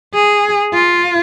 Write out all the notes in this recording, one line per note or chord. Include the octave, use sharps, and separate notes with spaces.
G#4
F4